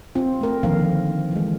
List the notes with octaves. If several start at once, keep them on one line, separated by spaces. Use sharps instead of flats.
C4 F4
A3 A#4
D3 D#3 F3 A#3 A#4 F5
E3 G#3